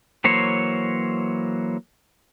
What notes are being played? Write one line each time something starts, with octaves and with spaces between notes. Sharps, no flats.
E3 F#3 A#3 C5 C#5